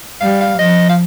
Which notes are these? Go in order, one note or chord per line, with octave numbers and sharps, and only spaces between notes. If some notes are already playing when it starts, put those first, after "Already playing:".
G3 F5
F5
F3 D#5
F5